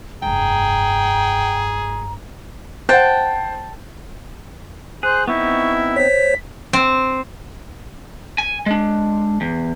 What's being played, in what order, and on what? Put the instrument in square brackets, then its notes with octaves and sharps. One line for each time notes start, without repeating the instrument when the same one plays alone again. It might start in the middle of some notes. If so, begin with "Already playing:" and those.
[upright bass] F1 G2 [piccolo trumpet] G#4 [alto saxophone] G5 [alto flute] A#5
[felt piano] C5 F#5 [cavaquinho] G5 A5
[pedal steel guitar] G#4 [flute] C5 [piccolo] F#6
[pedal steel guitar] B3 C4 D#4 [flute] E4 [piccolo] C#6
[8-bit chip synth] C5 C#5 [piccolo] B6
[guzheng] C4
[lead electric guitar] G#5
G#3 D4
E2